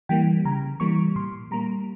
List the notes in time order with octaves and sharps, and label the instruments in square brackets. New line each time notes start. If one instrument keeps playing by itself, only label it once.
[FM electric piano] E3 G3 A#3 G5
C#3 A#5
E3 G3 A#3 C#6
A#2 C6
G3 A#3 A#5